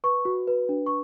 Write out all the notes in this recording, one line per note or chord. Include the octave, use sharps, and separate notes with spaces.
B4 C#6
F#4
B4
D4
C#6